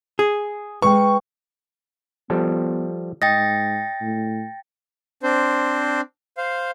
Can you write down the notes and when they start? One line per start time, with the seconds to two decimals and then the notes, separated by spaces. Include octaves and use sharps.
0.19 G#4
0.82 G#3 B4 G5 C#6
2.30 F3 G3 B3 A4
3.22 G#2 D#5 G5 A6 A#6
4.01 A2
5.23 C4 D4 C5
6.38 C5 F5